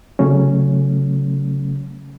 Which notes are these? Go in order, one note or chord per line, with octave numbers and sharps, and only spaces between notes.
C#3 F#3 A3 C#4